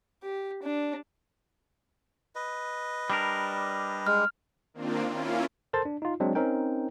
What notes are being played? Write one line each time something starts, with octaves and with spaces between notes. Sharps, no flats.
G4
D4
B4 D#5
G3 D4 A#4
G#3 F6
D#3 A#3 C4 D4 F4
A#3 C#4 E4 F4
A4 A#4 C5 A5 C6 A6
D4
D#4 F4
F#3 G#3 C4 D4
C4 C#4 D#4 A#4 G5